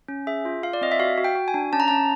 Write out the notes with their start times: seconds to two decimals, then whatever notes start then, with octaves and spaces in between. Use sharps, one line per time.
0.08 C#4
0.27 G#4 E5
0.45 F4
0.63 F4 F5
0.73 D5
0.81 C4 D#5
0.92 E5
0.99 F#4 F5
1.18 F#4
1.24 G5
1.35 F#4
1.48 G#5
1.54 D4
1.73 C#4 A5
1.80 A#5
1.88 C#4 A5